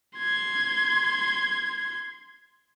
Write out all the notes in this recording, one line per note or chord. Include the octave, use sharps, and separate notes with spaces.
C6 G#6